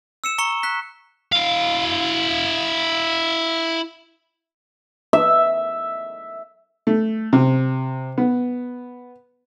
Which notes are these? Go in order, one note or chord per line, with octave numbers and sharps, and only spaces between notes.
E6 C#7 E7
A#5 C#6 C#7 G7
F#6 B6
E4 F5
E5
A3
C3
B3